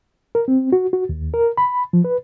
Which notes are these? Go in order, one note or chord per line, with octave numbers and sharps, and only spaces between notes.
A#4
C4
F#4
F#4
D#2
A#4
B5
F3
B4